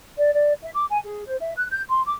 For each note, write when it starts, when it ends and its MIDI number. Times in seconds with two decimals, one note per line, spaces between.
0.18 0.34 74
0.34 0.52 74
0.62 0.71 76
0.75 0.86 86
0.90 0.99 80
1.04 1.23 68
1.26 1.36 72
1.41 1.52 76
1.57 1.66 90
1.71 1.82 91
1.89 2.01 84
2.06 2.17 86